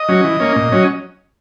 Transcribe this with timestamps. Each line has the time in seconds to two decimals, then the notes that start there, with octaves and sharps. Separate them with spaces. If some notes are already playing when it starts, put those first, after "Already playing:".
Already playing: D#5
0.09 F#3 C#4
0.24 E3
0.40 A#3 C#4
0.56 A#2
0.72 F#3 C#4